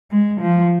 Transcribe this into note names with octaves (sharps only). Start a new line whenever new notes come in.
G#3
F3